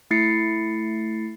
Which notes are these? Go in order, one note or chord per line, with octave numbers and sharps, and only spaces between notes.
A3 E4 A6 C7 C#7